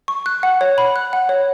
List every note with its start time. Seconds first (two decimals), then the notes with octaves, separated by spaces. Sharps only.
0.08 C#6
0.26 F#6
0.43 F#5
0.61 C#5
0.78 B5
0.96 F#6
1.13 F#5
1.29 C#5